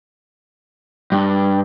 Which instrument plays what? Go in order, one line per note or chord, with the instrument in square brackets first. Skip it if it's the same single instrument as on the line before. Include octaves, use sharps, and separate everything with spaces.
[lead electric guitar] G2